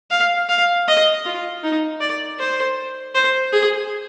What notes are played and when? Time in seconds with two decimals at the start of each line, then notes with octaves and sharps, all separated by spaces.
0.11 F5
0.49 F5
0.88 D#5
1.25 F4
1.63 D#4
2.00 D5
2.39 C5
3.14 C5
3.53 G#4